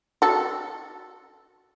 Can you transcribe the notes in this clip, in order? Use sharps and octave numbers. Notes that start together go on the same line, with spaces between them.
F#4 A4